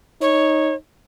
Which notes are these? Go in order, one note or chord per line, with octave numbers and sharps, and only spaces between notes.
D#4 C#5